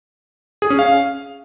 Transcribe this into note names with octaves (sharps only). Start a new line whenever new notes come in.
G#4
C#4
F5